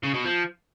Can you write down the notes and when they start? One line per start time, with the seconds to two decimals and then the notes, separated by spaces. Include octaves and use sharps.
0.03 C#3
0.14 B2
0.25 F3